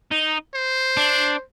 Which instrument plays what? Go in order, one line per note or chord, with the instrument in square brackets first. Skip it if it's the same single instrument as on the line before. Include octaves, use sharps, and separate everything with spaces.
[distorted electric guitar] D#4
[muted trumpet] C5
[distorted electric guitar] D4